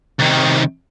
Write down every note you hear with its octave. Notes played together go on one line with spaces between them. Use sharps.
C2 D#3